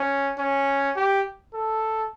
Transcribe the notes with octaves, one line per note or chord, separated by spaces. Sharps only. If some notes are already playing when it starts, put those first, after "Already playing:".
Already playing: C#4
C#4
G4
A4